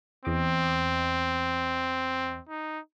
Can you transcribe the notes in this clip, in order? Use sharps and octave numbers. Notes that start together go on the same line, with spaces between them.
E2 C4 D#5 D6
D#4